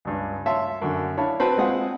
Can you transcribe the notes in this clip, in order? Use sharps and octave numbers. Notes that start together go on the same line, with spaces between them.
C#2 G2
C#5 E5 F5 A5 C6
F#2 D3
D4 E4 C#5 F5 A5 B5
C4 F#4 B4 A5
G#3 C4 F4 G#4 F#5